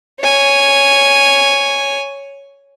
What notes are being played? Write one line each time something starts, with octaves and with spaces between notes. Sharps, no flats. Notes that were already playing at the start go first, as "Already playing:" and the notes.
C#5 G#5